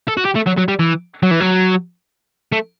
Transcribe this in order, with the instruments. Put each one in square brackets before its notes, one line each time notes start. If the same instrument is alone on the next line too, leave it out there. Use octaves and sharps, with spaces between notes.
[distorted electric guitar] A4
F#4
G4
A3
F#3
F#3
G3
E3
F#3
E3
F#3
A3